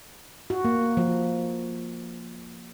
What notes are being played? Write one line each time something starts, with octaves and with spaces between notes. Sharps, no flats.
F#4
A#3
F3